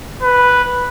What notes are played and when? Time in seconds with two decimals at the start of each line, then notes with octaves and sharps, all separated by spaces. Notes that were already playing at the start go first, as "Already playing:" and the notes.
0.23 B4